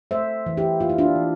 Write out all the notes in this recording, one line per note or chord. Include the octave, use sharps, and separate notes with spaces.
A3 C5 E5
E3
E4 G4
A#3 F4
E4
D4 F4
E3